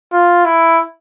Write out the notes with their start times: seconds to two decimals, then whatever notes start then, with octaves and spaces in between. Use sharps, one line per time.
0.13 F4
0.45 E4